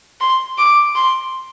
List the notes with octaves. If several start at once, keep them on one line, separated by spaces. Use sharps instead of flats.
C6
D6
C6